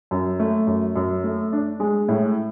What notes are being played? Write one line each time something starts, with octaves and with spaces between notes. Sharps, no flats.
F#2
A3
F#2
F#2
A3
D4
G#3
A2